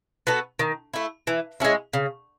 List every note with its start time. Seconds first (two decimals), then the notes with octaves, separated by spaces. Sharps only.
0.27 B3 F#4 A4
0.59 D#3
0.94 A3 E4
1.27 E3
1.60 G#3 C#4 E4
1.93 C#3